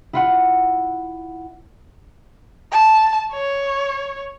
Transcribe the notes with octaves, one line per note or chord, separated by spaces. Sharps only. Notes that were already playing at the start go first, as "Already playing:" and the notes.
E4 F4 F#5
A5
C#5